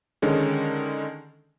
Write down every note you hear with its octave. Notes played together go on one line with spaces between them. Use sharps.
D3 D#3 G#3 C#4